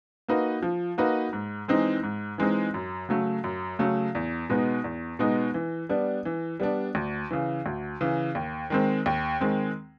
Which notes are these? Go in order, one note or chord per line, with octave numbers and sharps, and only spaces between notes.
A#3 D#4 F#4 B4
F3
A#3 D#4 F#4 B4
G#2
E3 G#3 C4 D#4
G#2
E3 G#3 C4 D#4
F#2
C#3 F#3 A3
F#2
C#3 F#3 A3
E2
B2 G#3 B3 D#4
E2
B2 G#3 B3 D#4
E3
G3 B3 D4
E3
G3 B3 D4
D2
C#3 E3
D2
C#3 E3
D#2
D#3 G#3 C4
D#2
D#3 G#3 C4